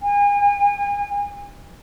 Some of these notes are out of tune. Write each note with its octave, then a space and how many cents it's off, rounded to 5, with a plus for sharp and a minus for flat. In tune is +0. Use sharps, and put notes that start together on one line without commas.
G#5 -40